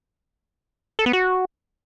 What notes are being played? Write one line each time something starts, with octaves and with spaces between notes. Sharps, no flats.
A4
B3
F#4